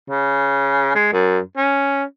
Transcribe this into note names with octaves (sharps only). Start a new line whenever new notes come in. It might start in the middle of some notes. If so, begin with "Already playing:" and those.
C#3
G#3
F#2
C#4